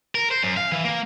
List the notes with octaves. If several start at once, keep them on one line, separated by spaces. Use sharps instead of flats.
A#4
C5
F#2
F5
E3
A#3